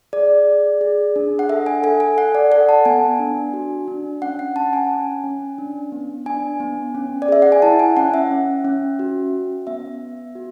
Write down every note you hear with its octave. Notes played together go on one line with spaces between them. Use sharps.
G#4 D5
G#4
G#4
D4
F#5
A4 E5
G#5
A4 G#5
G#5
A4 F#5
D5
A4 F#5
A5
B3 G#5
D4
F#4
D4
C#4 F#5
F#5
C#4 A5
G#5
C#4
C#4
D4
B3
D4 G#5
B3
C#4
D5
G#4 E5
F#5
G#5
E4 A5
G#5
C#4 F#5
E5
C#4
C#4
F#4
C#4
B3 E5
B3
F#4